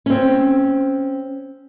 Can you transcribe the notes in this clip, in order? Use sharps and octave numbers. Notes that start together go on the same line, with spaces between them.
C4 C#4